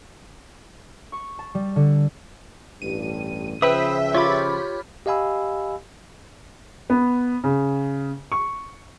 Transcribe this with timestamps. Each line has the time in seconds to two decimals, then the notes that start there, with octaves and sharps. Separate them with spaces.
1.12 C#6
1.39 A5
1.54 G3
1.76 D3
2.82 A1 G2 D#7
3.62 C#3 F3 B4 C5 E5 G5 B5 D#6
4.15 F4 G4 C#5 B5 D6
5.06 G4 D#5 F5 G#5 B5 E6
6.90 B3
7.44 C#3
8.32 C#6